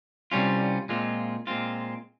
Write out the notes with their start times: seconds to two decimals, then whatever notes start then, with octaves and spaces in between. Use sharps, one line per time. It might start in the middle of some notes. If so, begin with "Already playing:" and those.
0.32 C2 C3 G3 C#4 F4
0.89 A#2 G#3 C4 F4
1.47 A#2 G#3 C4 F4